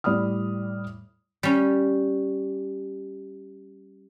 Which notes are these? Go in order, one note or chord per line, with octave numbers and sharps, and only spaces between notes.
A2 G3 D5 B5 D#6 F6
G3 C#4